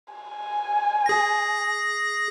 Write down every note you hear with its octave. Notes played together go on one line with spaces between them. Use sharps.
G#5
G#4 A#6